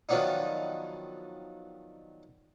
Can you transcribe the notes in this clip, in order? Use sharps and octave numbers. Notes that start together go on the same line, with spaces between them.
D#3 F3 F#3 B3 D4 D#4